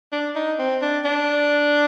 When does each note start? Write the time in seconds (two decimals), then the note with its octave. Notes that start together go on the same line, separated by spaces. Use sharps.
0.12 D4
0.35 D#4
0.59 C4
0.82 D4
1.05 D4